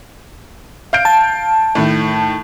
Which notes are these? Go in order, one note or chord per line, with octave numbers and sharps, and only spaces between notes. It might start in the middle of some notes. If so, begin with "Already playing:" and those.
F5 G6 D7
A5
A2 D#3 A3